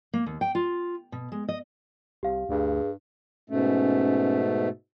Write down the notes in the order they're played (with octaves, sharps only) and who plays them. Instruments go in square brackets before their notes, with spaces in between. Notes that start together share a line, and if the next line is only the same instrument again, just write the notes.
[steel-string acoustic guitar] A#3
D#2
G5
F4
B2
G#3
D#5
[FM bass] C2 [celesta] G4 F5
[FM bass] D2 [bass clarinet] G2 [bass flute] G#4
[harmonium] G#2 B2 A3 [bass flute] C#4